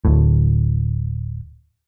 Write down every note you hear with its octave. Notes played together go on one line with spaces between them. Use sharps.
D1 A2